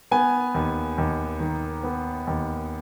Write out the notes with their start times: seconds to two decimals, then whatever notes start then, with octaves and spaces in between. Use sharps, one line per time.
0.11 B3 G#5
0.54 D#2
0.98 D#2
1.40 D#3
1.84 B3
2.27 D#2